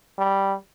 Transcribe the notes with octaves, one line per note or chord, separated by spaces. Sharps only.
G3